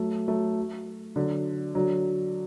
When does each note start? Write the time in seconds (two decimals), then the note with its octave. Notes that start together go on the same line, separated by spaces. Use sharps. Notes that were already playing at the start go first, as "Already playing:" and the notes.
Already playing: F#3 A3
0.28 F#3 A3
1.16 D3 F#3
1.75 D3 F#3